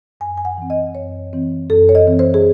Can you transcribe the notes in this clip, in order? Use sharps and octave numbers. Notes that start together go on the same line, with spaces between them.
F#2 G#5
G#5
F#5
E3 C4
D#5
F#2 C#5
E3 C4
F#2 A4
C#5
D#5
E3 C4
C5
G#4